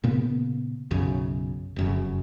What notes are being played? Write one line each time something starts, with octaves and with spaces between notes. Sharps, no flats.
A#2 C#3 A#3 B3
B1 F#2 C#3
F1 F#2 C#3